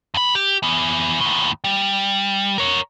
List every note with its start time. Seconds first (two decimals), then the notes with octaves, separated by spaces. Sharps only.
0.14 F2 B5
0.35 G4
0.63 E3 B3
1.20 D#2 A2
1.64 G3
2.58 A#4 C#5